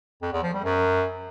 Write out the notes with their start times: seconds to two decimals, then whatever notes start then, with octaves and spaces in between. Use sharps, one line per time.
0.22 F2
0.33 E2
0.43 F3
0.54 G3
0.64 F#2